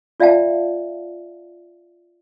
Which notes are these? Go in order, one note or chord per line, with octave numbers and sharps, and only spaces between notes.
F4 D5 E5 F5 G5 A5